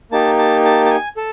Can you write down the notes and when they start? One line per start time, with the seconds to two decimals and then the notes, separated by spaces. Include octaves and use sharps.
0.11 A#3 D#4 G4 A5
0.39 A5
0.65 A5
0.85 A5
0.90 G#5
1.17 A4